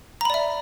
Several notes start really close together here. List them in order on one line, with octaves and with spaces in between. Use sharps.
A#5 B5 D5 E5